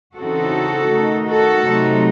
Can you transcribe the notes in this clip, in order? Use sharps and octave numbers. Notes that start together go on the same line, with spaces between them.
C#3 E3 C4 D#4 F#4 A4
D#3 A3 D#4
F#4 A4
C3 F#3 A3 D#4